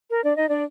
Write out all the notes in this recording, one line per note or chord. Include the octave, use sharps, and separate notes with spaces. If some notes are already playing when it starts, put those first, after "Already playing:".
A#4
D4 D5
D#4 D#5
D4 D5